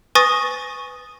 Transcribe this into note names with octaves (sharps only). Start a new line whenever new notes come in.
B4 G#5 C#6 D#6 A6 A#6